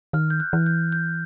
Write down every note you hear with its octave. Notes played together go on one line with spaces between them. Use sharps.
D#3 F6
G6
F#6
E3
G6
G6